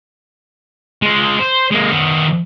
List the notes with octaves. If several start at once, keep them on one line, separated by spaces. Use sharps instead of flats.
G#3 F4
C5
G#3 A#3
D#3 B3